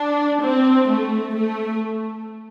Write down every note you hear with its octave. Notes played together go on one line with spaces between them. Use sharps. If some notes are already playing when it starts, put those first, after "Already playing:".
Already playing: D4
C4
A3
A3